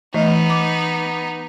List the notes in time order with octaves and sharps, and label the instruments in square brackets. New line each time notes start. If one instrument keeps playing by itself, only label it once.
[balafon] E3 A3 D#5 [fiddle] B3 D#4
[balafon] D6